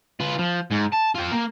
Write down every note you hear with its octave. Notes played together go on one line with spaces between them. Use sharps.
F4 B4
F3
G#2
A5
F4 G5
A#3